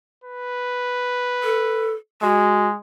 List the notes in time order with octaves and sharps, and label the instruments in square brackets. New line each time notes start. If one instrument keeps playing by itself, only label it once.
[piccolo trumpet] B4
[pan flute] A4
[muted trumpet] G#3 [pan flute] F#4